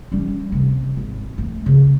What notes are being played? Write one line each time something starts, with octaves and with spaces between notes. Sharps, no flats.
G3 C#4
C3
G#1
A3
C#3